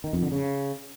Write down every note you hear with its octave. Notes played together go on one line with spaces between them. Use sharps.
D#3
F2
D3
C#3